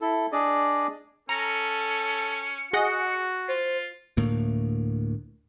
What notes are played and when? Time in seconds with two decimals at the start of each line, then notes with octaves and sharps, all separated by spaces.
0.01 E4 A4
0.32 D4 G#4 D5 D#5
1.29 C#4 A4 A#5 C#7
2.73 F#4 G#4 D#5 F#5
3.48 F4 C5
4.17 D2 A2 A#3